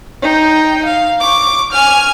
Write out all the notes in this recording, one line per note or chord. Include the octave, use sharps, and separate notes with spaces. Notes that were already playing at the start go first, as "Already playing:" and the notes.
D#4 G5
F5
C#6 D6
G#5 F6